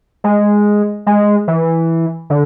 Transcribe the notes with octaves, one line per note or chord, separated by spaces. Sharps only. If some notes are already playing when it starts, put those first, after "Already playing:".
G#3
G#3
E3
D3